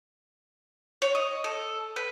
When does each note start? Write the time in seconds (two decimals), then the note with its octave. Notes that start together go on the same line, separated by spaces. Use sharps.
1.02 C#5
1.15 D#5
1.44 A4
1.96 B4